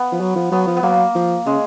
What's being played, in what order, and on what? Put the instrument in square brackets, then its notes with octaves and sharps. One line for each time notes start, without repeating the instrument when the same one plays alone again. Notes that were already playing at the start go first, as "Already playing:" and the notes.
Already playing: [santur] B3
[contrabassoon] F3
F#3
F3
[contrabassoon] F#3 [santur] B3
[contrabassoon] F3
[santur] B3
[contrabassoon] F#3 [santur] A#3
[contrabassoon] F3
[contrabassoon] C#3 [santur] G#3